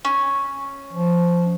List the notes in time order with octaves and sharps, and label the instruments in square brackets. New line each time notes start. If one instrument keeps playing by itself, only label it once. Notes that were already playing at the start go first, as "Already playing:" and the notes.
[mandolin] C#4
[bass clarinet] F3